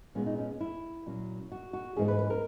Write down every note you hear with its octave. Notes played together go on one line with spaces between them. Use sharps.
A#2 G#3 B3 C#4
D#4
C#4
E4
A#2 F#3 C#4
F#4
F#4
G#2 E3 A#3 C#4 G#4
B4
B4
A#4